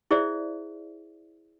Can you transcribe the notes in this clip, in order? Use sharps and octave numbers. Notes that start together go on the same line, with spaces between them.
E4 G#4 C5 D5 E5